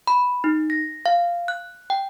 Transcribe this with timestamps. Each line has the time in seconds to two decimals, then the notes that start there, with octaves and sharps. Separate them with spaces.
0.07 B5
0.44 D#4
0.70 A#6
1.06 F5
1.48 F#6
1.90 G5